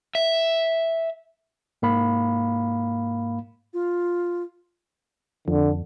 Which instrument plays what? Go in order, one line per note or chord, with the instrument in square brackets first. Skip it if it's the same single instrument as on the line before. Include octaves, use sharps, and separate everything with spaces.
[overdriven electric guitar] E5
[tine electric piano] G#2 A#3 F5 B5
[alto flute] F4
[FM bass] F2 [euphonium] D3